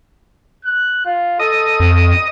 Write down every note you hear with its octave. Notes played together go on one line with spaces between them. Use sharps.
F#6
F4
A4 D#5
F2